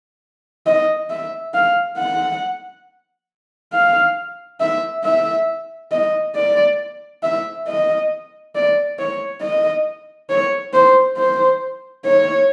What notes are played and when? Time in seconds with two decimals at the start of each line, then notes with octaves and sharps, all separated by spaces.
0.67 D#5
1.10 E5
1.54 F5
1.98 F#5
3.73 F5
4.61 E5
5.04 E5
5.92 D#5
6.36 D5
7.23 E5
7.67 D#5
8.55 D5
8.99 C#5
9.42 D#5
10.30 C#5
10.74 C5
11.18 C5
12.05 C#5